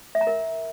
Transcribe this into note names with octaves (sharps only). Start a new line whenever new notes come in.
E5
A#5
A#4